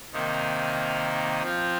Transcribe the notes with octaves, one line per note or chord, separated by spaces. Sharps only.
C3 D#3 A#3 D#4
F3 C4 F4